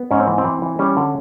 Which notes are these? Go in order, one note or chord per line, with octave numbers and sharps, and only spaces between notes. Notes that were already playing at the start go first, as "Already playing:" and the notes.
Already playing: B3
G#2 C#4
C4
E3
C4
E3
E3
G3 C#4
D3